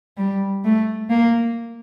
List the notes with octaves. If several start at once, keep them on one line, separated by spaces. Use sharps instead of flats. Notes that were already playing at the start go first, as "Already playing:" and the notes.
G3
A3
A#3